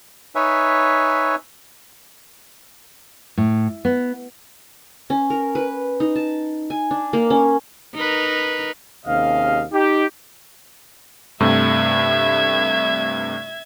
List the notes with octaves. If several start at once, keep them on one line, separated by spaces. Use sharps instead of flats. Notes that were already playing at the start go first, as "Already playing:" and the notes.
D#4 B4 C#5 E5 G#5
A2
B3
C#4
A#4
B4
D#4
A5
G#5
D4
A#3
C#4
D#4 A#4 B4
D#2 C3 C#4 G#4 D#5 F5
D#4 G4
G2 C3 A3 E5 G#6